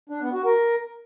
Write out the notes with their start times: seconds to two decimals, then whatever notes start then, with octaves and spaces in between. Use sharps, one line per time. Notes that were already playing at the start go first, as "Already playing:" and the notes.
0.09 D4
0.21 B3
0.33 F#4
0.45 A#4